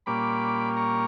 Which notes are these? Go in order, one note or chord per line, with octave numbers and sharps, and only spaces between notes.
A#2 G3 A#3 C#4 B5 D6
A#5 C#6